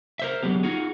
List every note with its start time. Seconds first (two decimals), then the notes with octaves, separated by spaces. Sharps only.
0.19 A#4 C5 E5
0.43 D3 F#3 G#3 B3 G4
0.63 D#4 F4 F#4 G#4